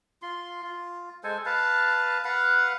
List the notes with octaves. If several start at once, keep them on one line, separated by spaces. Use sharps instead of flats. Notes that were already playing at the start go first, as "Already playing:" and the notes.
F4 C6
F4
G#3 A4 C5 G#5
B4 F5 A5
B4 F5 F#5